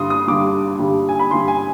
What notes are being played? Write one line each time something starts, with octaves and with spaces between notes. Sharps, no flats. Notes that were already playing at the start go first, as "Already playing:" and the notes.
Already playing: G2 D3 G3 C6 D#6
D#6
G2 D3 G3 D6
G2 D3 G3
G#5
B5
G2 D3 G3 C6
G#5